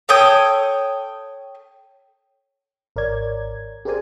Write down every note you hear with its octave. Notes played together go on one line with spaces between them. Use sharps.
A4 C#5 G5 D#6
G#1 A#4 C#5 D5 G#6
G4 G#4 A#4 C5 D5 G#5